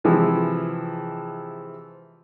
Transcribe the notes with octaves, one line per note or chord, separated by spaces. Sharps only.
C3 E3 F3 G#3